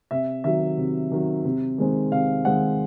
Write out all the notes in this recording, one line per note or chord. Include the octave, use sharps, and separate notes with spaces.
C3 E5
D#3 F#3 E5
C3
D#3 F#3
C3
D#3 G#3 C4
C3 F5
D#3 G#3 C4 F#5